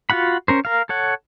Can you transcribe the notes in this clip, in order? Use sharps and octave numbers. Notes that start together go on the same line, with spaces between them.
F4 F#4 F#5 B5
C#4 A#4 C5
A#4 F5
A4 C#5 F#5